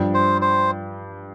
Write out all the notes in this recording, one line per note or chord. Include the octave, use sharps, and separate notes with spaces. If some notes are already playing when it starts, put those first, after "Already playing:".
Already playing: G2 F3 D4
C5
C5